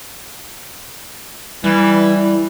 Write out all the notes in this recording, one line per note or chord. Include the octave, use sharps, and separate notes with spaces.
E3 G3
E4